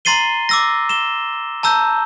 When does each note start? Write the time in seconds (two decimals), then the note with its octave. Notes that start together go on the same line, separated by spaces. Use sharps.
0.05 A#5 C6 A6 C7 D#7 G7
0.49 D6 E6 A#6
0.89 E7 G7
1.63 A5 A#5 E6 G6